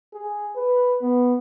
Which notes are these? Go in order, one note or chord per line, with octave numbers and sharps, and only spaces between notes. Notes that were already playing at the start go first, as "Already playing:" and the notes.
G#4
B4
B3